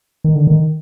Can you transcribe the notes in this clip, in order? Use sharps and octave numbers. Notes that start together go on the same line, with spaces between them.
D#3
D3
D#3